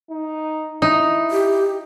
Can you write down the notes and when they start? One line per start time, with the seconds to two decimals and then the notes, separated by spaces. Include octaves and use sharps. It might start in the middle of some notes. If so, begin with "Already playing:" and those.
0.10 D#4
0.82 D#4 E4
1.31 G4